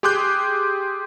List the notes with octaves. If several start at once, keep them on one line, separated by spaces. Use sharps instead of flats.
G4 G#4 C6 D6 F#6 G6